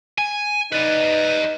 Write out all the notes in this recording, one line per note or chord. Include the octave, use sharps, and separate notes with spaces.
G#5
D#4 B4 D5 D#5